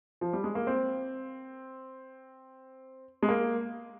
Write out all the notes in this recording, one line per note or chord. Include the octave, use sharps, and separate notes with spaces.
F3
G3
G#3
A#3
C4
G#3
A#3